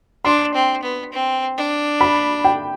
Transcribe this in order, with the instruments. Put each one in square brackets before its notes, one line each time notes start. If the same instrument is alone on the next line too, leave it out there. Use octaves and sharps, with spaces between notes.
[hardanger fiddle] D4 [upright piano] C6
[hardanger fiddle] C4
B3
C4
D4
[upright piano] B5
G5